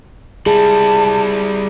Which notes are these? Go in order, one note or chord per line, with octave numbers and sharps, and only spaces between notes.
G3 E4 G#4 A5